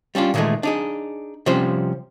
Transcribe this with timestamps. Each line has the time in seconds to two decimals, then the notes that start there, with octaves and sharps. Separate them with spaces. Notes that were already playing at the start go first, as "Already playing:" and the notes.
0.15 G3 C#4 D4 F4
0.34 A#2 D#3 E3 F#3 G#3 A3
0.63 D4 D#4 G#4
1.46 C3 F3 G3 C#4 C5